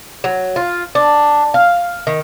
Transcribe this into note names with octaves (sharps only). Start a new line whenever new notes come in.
F#3
F4
D4
F5
D#3